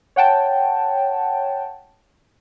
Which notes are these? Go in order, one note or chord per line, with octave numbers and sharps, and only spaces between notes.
C#5 F#5 G5 A5